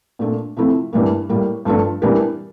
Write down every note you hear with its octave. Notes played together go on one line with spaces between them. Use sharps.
A#2 A3 D4
C3 F3 A3 E4
G2 E3 G3 A#3
A2 G3 A#3
G2 F3 A3 D4 A4
E3 G3 D4 G4 A#4